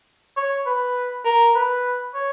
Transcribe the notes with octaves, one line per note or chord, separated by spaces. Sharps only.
C#5
B4
A#4
B4
C#5